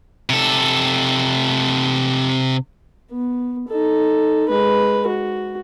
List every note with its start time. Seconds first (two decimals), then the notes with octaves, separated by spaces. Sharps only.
0.30 C3 A4
3.12 B3
3.68 D#4 A4
4.49 G#3 B4
5.07 F#4